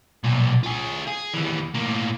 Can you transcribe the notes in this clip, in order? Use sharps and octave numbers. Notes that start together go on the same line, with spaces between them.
B1 A#2
F4 G#4
G#4
D#2 E3
A2 A#3